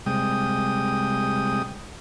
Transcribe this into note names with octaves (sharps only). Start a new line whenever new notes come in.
C3 G3 G#3 G5 D#6